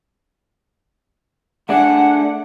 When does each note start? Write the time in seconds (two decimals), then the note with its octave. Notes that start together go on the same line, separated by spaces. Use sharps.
1.69 A3 D4 G#4 F#5